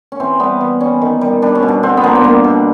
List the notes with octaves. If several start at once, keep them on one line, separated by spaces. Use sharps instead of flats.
C#4
E3 C4
G3 B3
E3
G3 C#4
D#3
G3
G3 D4
C#4
B2
D4
D3 C4
B3
F3 A#3
B3
G3 A#3
B2